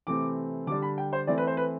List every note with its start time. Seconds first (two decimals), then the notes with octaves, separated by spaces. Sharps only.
0.07 C3 E3 A3 C4 D6
0.67 D3 G3 D4 D6
0.82 B5
0.98 G5
1.13 C5
1.27 E3 A3 C4 D5
1.38 B4
1.47 C5
1.57 B4